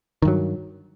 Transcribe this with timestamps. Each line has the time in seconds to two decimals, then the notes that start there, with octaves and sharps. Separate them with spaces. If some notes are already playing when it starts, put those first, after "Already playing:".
0.22 D#3
0.25 G2
0.28 F#3